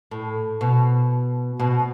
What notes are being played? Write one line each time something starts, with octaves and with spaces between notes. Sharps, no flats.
A2
B2
B2